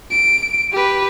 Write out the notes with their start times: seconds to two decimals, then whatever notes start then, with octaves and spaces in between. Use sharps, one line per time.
0.11 D7
0.72 G4 B4